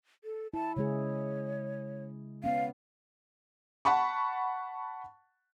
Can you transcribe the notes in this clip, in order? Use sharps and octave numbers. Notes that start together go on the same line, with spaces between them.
A4
E4 A5
C#3 G#3 G#4 C#5
B3 C#4 F5
F#5 A5 B5 C#6